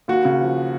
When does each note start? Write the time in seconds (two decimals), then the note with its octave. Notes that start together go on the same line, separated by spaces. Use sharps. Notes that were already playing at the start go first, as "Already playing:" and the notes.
0.08 D#2 F#4
0.25 C#3
0.40 F3